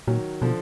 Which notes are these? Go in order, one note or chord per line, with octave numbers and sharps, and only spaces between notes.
A#2 D#3 F#3
B2 D3 F3